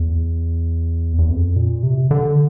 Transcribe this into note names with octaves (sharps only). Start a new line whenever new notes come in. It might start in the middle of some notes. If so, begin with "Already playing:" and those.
Already playing: E2
E2
F2
A#2
C3
D3